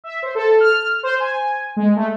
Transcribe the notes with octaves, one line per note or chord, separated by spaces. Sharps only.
E5
C5
A4
F6
C5
G#5
G#3
A3